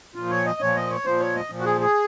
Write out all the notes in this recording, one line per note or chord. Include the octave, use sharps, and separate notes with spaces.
A#2 F3 F4
C#5
D#5
A#2 F3 C#5
D#5
C#5
A#2 F3 C5
C#5
D#5
A#2 F3
F#4
G#4
G#4